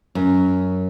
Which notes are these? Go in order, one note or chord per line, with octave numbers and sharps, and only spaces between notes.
F#2